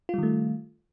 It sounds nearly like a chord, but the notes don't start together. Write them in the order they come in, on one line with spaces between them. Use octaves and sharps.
F4 G3 D#3 A3